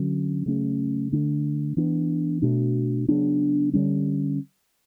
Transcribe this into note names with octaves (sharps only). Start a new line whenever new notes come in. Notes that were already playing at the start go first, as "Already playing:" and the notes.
Already playing: D3 F#3 C#4
C#3 F#3 A3 C#4
D3 A3 D4
E3 B3 D4
B2 A3 D4
C#3 F#3 B3 D4
D3 G3 C#4